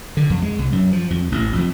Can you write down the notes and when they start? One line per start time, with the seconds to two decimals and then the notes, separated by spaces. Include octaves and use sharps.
0.17 D3
0.30 F2
0.42 G#3
0.59 C2
0.72 F#2
0.93 F3
1.10 F2
1.32 A1
1.56 F2